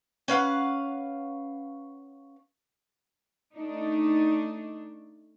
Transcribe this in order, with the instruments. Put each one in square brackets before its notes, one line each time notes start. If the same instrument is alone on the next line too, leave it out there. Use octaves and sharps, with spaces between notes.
[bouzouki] C#4 B4 F5 F#5
[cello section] A3 D4 D#4